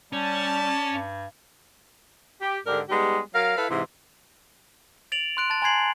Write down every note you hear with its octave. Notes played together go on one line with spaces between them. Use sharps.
G3 C#4 D5 A5
G2
G4
G#2 D3 D4 G4 A#4
G3 G#3 B3 D#4 G4
F#3 A#4 F5
E4 A4 B4 F5
G#2 C3 E3
A6 D7 F7 F#7
C6 F#6 D7
A5 A6
G#5 A#5 C6 G#6 C7 F#7